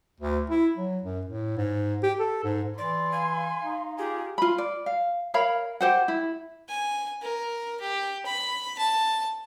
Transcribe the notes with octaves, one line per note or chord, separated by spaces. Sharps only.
D2
E4
F#3
F#2
A2
G#2
G4
A4
G#2
E3 D5 C6
F5 G#5
D#4
F4 G4 G#4
F4 B5
D5
F5
A#4 C#5 F5 B5
G4 C5 F#5
E4
G#5
A#4
G4
B5
A5